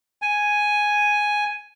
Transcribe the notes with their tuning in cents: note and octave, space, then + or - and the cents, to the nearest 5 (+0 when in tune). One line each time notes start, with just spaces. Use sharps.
G#5 +0